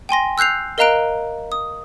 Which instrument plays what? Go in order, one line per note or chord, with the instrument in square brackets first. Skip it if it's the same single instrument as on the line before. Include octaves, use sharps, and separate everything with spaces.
[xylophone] G5 G#5 C6 A#6
E6 F#6 G6 C7 F7
A#4 D#5 F5 A#5 F#6 D7
D#6